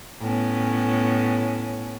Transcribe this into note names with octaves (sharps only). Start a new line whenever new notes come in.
A2 B3 C#4